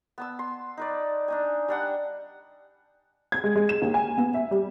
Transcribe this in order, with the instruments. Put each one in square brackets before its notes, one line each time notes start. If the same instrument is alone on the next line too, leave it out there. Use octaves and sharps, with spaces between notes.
[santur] B3 A5 E6
C6
D#4 B4 D5
D4 D#4 G#5
G3 D4 F#5
[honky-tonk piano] G#6
G#3
G#3
E7
D#2
G#5
B3
E5
G3